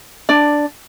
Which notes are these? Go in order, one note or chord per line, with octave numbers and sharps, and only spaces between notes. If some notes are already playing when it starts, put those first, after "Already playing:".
D4 D5